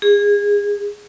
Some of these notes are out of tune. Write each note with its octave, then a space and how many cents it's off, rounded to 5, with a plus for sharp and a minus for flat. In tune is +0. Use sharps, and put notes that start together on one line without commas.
G#4 -25